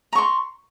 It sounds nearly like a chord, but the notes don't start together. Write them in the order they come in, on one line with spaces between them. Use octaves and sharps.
A#5 C#6 C6